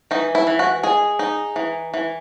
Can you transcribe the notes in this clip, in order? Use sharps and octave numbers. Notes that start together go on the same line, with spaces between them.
E3 D#4
E4
E3
F#4
G#3 G#4
D#4
E3
E3